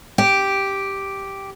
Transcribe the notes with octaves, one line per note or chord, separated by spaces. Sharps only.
G4